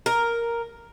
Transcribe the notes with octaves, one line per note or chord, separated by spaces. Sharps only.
A#4